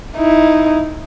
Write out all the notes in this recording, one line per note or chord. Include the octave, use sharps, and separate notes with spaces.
D#4 E4